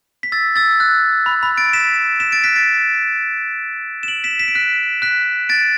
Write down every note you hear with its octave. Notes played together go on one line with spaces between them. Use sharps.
B6
E6 A6
E6 A6
F#6
B5
B5
A6 D7
B6 E7
B6 E7
A6 D7
F#6 B6
A6 D7
E7
D7 F#7
B6 E7
B6 E7
D7
F#6 B6
F#6 B6
A6 D7